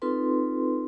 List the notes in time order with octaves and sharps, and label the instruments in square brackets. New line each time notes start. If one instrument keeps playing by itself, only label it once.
[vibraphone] C4 D#4 F4 A4 B4 C6